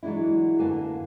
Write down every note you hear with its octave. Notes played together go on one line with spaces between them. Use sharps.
E3 F#3 G#3 D4 E4
F#2 D3 A#3 B4 G#5 A5